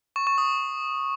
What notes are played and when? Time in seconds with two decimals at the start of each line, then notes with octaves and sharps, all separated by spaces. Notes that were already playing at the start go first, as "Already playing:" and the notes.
0.16 C#6
0.27 C#6
0.38 D#6